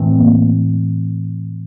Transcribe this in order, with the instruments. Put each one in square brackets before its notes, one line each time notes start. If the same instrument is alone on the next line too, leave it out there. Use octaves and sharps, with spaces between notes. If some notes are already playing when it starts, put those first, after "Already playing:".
Already playing: [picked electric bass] A2 E3 A3 C4
[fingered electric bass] A#3